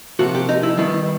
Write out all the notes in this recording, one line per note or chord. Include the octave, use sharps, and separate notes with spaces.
C3 F3 A#3 F#4
G4
D#4
E4
D#3 G3 B3 E4